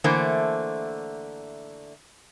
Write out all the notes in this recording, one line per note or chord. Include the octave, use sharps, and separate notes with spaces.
D3 E3 A3 A#3 C5